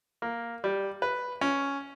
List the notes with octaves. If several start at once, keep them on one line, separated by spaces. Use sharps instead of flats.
A#3
G3
B4
C#4